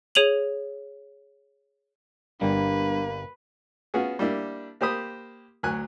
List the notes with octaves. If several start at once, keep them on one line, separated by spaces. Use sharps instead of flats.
G#4 C#5 D#7 F7 F#7
G1 G2 G3 A#3 B4
B3 C#4 F4 F#4 G#4
G3 A#3 D4 E4
A#3 G4 C5 B5 D#6
D2 F#3 G#5 F#6